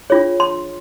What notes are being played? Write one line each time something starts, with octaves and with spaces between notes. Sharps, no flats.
D4 F4 G#4 C#5
C6